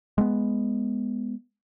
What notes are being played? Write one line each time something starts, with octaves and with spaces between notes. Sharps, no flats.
G#3 A3 B3